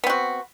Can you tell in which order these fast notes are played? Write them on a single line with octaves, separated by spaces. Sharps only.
B3 C4 F#4